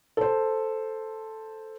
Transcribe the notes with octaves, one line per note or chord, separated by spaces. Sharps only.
A4 C5